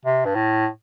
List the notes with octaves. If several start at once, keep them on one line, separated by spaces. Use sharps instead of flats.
C3
G2
A2